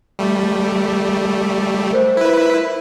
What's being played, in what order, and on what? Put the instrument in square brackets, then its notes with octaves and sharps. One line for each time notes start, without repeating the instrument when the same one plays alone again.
[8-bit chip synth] G3 A3
[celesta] A#4 C5
[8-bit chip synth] E4 B4